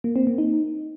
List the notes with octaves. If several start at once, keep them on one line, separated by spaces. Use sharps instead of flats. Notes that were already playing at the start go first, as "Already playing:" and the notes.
A#3
C4
A#3
D#4